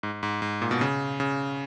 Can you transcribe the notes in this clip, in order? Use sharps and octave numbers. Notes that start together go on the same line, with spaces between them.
G#2
G#2
G#2
A#2
B2
C#3
C#3